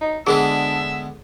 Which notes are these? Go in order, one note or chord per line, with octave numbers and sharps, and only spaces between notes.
D#4
D3 G#3 B3 D4 G#4 E5 E6